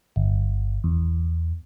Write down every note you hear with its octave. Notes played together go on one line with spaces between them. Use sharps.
G1
E2